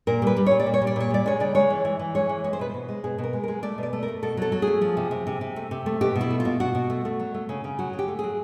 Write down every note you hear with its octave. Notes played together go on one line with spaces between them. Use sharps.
A#2 A#4
G3 B4
G3
A#2 C#5
D5
A#2
C#5
G3
D5
A#2 C#5
G3 D5
G#3 C#5
C#3 D5
G#3 C#5
E3
E3
E3
G#3 C#5
E3
G#3 C#5
C5
B2 B4
B2 C5
G#3
B2 G#4
B2
A#4
G#3
G#3 A#4
A3 D5
B2 D5
A3
A#4
A3
B2 A4
F#3 A4
F#3
G#4
A3
F3
C3
C3
C3
C3
A3
C3
A3
B2 G4
B2
E4
A3
F4
B2
B2 F#4
B2
A3
A3
F#3
A3
C#3
C#3
F#3 F#4
C#3
G4
A3
F#3 G#4